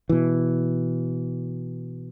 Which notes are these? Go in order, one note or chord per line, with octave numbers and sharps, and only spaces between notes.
B2 E3